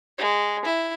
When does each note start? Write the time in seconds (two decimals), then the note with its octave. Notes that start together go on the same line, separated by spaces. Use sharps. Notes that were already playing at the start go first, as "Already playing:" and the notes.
0.19 G#3
0.65 E4